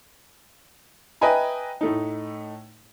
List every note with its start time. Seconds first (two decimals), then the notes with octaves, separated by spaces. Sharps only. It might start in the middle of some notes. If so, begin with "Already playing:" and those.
1.21 B4 D#5 E5 G5 G#5 A#5
1.81 A2 A3 D#4